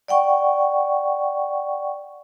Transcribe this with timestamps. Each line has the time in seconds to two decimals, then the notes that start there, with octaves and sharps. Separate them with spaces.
0.08 D5 F#5 G5 C#6